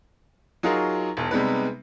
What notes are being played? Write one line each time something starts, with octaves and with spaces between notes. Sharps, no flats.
F#3 D#4 F4 F#4 G#4 A#4
E1 B1
C3 G3 G#3 B3 D#4 B4